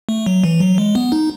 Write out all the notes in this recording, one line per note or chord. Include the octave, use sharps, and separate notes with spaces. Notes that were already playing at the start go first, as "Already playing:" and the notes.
A3
F#3
E3
F#3
G#3
B3
D#4